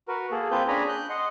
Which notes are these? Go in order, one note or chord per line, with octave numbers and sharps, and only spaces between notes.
F#4 A#4 B4
A#3 G#4 A4
A#3 C4 F4 B4 G6
C#4 D4 G#4 G#5 A#5 B5
F#6 G6
D#5 F#5 C6